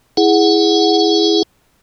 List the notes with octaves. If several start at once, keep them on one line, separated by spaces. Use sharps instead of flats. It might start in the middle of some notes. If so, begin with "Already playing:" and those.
E4 G#4 F#5